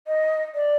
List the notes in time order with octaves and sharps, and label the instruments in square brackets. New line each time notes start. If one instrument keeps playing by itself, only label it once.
[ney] D#5
D5